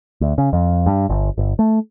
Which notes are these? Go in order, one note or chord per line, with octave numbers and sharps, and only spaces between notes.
D2
C#3
F2
G2
G1
G1
A3